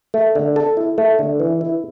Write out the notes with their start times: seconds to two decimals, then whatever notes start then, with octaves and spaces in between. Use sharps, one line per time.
0.14 A3
0.35 D3
0.56 A4
0.77 E4
0.98 A3
1.19 D3
1.40 E3
1.61 E4